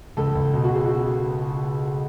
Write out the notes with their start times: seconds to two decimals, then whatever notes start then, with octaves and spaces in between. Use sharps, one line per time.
0.17 C#2 A4
0.35 C#2
0.54 B2
0.64 F#4
0.72 B2 G#4
0.85 F#4